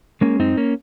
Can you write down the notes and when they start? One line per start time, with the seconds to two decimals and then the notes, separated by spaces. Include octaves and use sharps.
0.21 G#3 A#3 C#4
0.40 F#2 C4 D#4
0.57 A#3 C#4